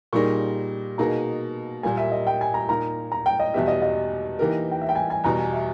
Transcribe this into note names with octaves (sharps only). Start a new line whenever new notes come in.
A#2 G3 A#3 D#4 G#4 C#6
B2 A#3 D#4 G#4 A#5
A#2 G3 A#3 G#5
E5
D#5
G5
G#5
A#5
A#2 A#3 D#4 A#4 A#5
A#5
G5
D#5
E2 B2 G3 B3 G4 E5
D#5
D#5
E3 A#3 D#4 G4 A#4
G5
E5
G5
G#5
G#5
E2 B2 G3 A#5
G#5
E5